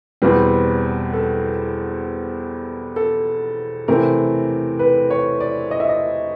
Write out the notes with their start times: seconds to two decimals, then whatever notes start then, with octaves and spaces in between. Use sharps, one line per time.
0.22 E2 B2 G3 C4 B4
1.13 A4
2.96 A4
3.88 C3 E3 A3 C4 A#4
4.79 B4
5.10 C#5
5.40 D5
5.71 D#5
5.80 E5
5.89 D#5